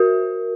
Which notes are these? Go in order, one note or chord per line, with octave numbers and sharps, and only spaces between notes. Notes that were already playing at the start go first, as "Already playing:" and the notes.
Already playing: F#4 A#4